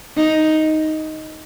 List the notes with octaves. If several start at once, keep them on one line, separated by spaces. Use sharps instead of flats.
D#4